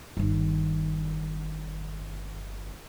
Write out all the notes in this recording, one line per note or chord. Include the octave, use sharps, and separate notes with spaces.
G1 D#3